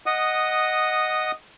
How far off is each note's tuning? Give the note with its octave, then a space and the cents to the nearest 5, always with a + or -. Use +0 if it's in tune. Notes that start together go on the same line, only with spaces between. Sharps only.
D#5 +0 F#5 +0 D#6 -10